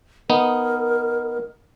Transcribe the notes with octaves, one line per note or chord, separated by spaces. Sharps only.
B3 D#4 A#4